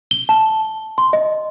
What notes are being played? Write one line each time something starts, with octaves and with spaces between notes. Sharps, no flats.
G7
A5
C6
D#5